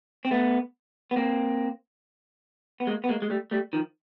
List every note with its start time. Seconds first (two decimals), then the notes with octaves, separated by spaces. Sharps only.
0.25 C4
0.31 A3 B3
1.11 B3
1.16 A#3 C4
2.80 B3
2.87 G#3 A#3
3.04 B3
3.09 G#3 A#3
3.22 G#3
3.30 G3 A3
3.51 G3 A3
3.73 D#3 F3